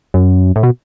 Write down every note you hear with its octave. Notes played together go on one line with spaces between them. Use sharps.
F#2
A2
B2